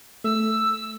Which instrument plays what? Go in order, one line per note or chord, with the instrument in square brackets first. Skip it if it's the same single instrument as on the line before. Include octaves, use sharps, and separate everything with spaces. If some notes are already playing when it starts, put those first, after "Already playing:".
[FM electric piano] A3 [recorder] E6